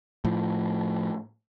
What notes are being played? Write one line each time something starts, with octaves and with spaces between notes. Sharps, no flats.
A2 F3